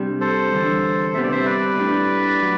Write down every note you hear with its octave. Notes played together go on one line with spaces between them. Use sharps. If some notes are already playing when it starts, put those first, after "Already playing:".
Already playing: C3 G3 D4
A4 C5
E2 D3 G3
C2 C3 G3 B3 E5
D5
C5 E5
B4 D5
A2 G3 D4
F#3